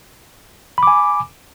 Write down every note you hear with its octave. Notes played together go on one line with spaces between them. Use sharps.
G#5 B5 D6